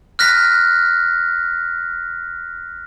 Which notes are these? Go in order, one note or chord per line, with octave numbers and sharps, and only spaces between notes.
F6 F#6 A#6 B6